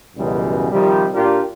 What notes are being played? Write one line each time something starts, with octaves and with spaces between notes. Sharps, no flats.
C#2 F#2 B2 E3 G3 G#3
C3 D#3 F3 G3
A#2 D4 F4 G4 A#4